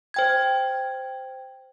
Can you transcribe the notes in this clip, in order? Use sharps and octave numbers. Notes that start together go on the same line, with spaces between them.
C5 G5 G#6